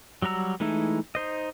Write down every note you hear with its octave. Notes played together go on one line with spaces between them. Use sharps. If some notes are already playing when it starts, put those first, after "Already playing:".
F#3 G3 F#4 A#5 E6
E3 G#3 A3 D#4 E4
D#4 C5 D#5